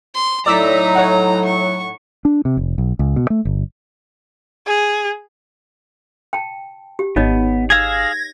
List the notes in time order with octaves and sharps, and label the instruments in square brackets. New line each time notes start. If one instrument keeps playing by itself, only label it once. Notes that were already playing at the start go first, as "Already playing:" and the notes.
[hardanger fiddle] C6
[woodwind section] A2 F#3 [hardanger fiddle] D#4 A#5 [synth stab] D5 E6 B6
[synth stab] C#5 F#5
[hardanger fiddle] C#6
[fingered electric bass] D4
C3
F1
B1
C#2
B2
A3
G1
[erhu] G#4
[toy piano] G5 A5
G4
[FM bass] G#1 [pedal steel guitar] B3 [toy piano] D#4 C#5 D#5
[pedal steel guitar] G#4 F5 E6 [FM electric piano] G#6 A#6